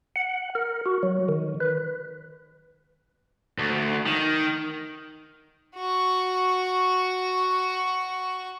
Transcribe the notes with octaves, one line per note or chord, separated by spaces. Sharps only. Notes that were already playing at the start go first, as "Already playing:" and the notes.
F#5
A#4
F#4
F#3
D#3
B4
D2
D#3
F#4 C#6